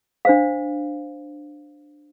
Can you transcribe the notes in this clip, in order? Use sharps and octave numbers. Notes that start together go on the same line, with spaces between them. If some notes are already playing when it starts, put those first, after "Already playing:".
D4 C5 F5